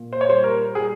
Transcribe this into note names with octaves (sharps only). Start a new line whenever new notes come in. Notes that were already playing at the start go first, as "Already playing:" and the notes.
Already playing: A#2
C5
C#5
G3 C5
A#4
G3 G#4